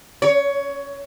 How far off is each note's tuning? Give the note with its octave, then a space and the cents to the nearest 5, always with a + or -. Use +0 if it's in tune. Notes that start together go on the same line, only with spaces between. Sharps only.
C#5 +15